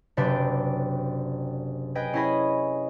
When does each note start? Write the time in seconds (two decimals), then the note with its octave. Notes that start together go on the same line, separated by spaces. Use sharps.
0.17 F#1 C3 D4 B4 G5 D6
1.95 G#4 B4 D#5 G5 G#5
2.13 C#4 E4 G#4 D#5 B5